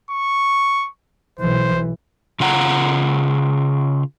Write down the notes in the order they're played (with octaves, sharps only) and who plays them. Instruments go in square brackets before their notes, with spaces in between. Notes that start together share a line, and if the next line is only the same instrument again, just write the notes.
[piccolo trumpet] C#6
[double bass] B1 E3 [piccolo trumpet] C5
[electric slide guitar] C#3 F4 F#5 A#5